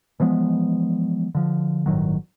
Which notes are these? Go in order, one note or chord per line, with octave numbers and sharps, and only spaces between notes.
E3 F3 G#3 B3
D3 F3
G1 A2 D#3 F#3